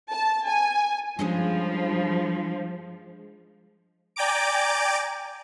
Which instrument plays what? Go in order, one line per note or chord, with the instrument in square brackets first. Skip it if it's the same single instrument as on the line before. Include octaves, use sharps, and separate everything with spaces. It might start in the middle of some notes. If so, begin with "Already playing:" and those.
[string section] A5
G#5
[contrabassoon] G2 [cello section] F3 [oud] G#3 C#4 G#4
[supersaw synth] D5 G5 G#5 A#5 D6 D7